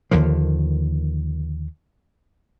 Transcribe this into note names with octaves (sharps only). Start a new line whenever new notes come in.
D#2 D3 D#3 F3